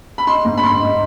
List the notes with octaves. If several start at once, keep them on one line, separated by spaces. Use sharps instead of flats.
B5
D#4 C6
G#2
B5
G#2 C6
D#4